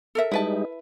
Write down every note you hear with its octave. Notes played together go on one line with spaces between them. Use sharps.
A4 A#4 E5
G3 G#3 D#4 E4 B4 A5